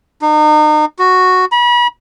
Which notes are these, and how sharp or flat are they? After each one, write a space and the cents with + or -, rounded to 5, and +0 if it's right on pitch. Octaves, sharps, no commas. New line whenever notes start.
D#4 -35
F#4 -5
B5 -35